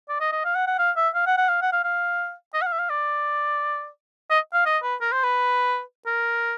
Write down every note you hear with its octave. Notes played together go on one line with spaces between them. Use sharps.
D5
D#5
D#5
F5
F#5
F#5
F5
E5
F5
F#5
F#5
F5
F#5
F5
F5
D#5
F#5
F5
E5
F5
D5
D#5
F5
D#5
B4
A#4
C5
B4
A#4